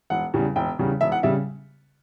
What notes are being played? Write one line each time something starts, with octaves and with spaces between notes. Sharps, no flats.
E1 F#5
E2 C#3 G3
E1 G5
E2 C#3 G3
E1 E5
F#5
C#3 G3 E5